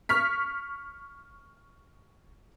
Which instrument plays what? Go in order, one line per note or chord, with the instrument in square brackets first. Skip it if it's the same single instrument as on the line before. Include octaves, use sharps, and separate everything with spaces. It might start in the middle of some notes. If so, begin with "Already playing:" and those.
[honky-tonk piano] C#6 F6 B6